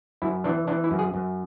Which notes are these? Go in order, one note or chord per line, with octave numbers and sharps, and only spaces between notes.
F#2 E4
E3 D4
E3 D4
E4
F#2
G#4
F#2